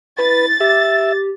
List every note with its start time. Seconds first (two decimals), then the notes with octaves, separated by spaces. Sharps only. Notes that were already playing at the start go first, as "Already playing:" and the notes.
0.19 E4 B4 A6
0.61 G4 E5